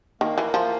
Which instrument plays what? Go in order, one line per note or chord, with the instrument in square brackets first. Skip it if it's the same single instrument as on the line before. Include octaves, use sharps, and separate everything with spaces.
[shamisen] D#3 [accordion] A#3
[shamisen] E3
F3